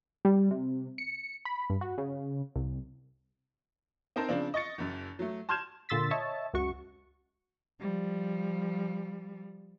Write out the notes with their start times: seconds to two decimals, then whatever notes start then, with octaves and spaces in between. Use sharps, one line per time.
0.25 G3
0.51 C3
0.98 C#7
1.45 B5
1.70 G2
1.81 F#4
1.98 C#3
2.56 C2
4.16 C4 D#4 A#4 C5 A5
4.29 C#3 F3 C4 D4
4.54 D#5 C#6 A6 C#7
4.78 F#1 F#2
5.19 F#3 A3
5.49 A5 C6 F6 G6 G#6 E7
5.89 A#2 D3 C6 E6 A6 B6
6.11 C#5 D#5 E5 A5
6.54 C#2 F#2 F#4 C#6
7.80 F3 G3